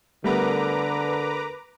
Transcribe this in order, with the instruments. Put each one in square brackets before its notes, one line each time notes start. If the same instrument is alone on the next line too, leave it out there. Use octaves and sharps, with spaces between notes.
[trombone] D3 [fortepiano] G3 A3 B3 [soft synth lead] A#4 [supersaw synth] B4 A#5 D6